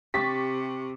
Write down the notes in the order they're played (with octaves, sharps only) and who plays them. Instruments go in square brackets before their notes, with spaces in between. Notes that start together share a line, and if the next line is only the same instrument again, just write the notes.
[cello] C3 [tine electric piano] G4 [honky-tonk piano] C#6 A6 B6